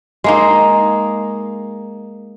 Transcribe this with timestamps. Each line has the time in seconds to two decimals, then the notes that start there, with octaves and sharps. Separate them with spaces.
0.24 G#3 A#3 D#4